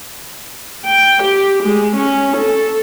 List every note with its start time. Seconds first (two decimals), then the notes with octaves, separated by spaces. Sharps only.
0.86 G5
1.23 G4
1.64 G#3
1.97 C#4
2.37 A4